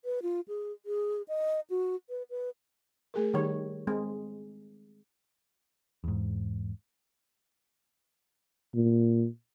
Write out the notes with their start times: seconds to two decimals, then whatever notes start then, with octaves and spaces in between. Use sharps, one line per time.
0.05 B4
0.22 F4
0.48 G#4
0.86 G#4
1.28 D#5
1.70 F#4
2.10 B4
2.30 B4
3.14 A3 G#4 A#4
3.34 D#3 G3 C#5
3.87 G#3 C4
6.04 E2 G#2
8.74 A#2